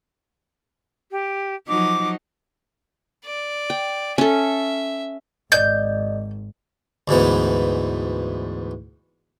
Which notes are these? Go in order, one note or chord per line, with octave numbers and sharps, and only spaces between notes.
G4
F3 F#3 D#4 D6
D5
G5
C#4 A4 E5
G#1 D5 D#5 G6
D2 G#2 E3 B3